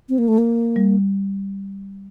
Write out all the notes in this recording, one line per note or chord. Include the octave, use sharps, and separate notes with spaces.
C4
A#3
A3
A#3
G3